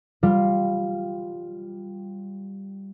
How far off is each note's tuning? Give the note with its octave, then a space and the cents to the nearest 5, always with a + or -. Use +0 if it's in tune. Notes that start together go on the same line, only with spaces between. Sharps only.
G3 +0 F4 +5